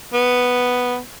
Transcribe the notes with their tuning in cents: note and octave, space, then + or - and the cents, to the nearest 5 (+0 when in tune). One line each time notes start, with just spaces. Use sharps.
B3 +0